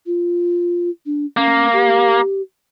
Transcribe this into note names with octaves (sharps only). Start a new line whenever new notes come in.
F4
D4
A#3 C#4
G4